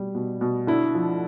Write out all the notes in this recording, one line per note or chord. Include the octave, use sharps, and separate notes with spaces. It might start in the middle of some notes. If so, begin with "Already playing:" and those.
Already playing: B2 G3
B2
B2
D3 E4
F3